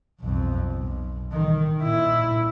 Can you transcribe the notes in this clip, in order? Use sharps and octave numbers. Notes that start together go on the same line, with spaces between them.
B1 F2
B1
D#3
A#2 E4